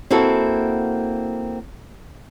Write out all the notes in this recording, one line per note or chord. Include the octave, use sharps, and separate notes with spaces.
A#3 C4 E4 F#4 A4